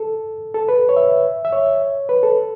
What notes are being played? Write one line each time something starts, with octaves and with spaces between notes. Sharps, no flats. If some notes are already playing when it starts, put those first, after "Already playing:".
Already playing: A4
A4
B4
C#5
E5
E5
C#5
B4
A4